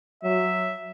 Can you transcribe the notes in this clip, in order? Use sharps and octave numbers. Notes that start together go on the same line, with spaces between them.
F#3 E5